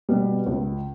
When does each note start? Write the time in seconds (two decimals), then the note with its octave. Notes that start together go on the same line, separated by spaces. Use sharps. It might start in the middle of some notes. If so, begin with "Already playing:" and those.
0.09 B2 G3 B3
0.47 C#2